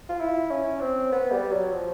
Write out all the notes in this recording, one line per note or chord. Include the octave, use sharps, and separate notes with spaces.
F4
E4
C#4
C4
B3
G3
F#3
F3